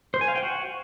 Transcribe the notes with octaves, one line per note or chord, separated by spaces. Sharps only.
C5
G#5
F5
G5
F#4